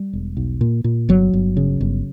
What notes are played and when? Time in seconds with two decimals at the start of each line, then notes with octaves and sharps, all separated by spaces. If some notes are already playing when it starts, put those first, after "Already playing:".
Already playing: G3
0.13 E1
0.37 B1
0.61 A#2
0.84 A#2
1.09 G1 F#3
1.33 G1
1.57 C#3
1.81 G1